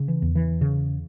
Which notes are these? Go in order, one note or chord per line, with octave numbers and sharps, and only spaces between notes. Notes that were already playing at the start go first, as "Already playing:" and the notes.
Already playing: C#3
E3
E2
E3
C#3